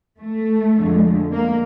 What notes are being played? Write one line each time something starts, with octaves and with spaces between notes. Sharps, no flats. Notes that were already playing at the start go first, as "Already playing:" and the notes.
A3
F2 D3 F3 G#3
A#3